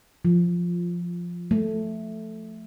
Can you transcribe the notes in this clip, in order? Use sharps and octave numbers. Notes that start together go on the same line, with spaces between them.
F3
A3